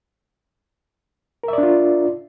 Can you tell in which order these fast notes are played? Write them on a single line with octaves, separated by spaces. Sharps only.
A#4 E5 D5 D4 F4